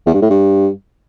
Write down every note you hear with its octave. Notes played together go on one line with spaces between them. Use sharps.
E2
G2
A2
G2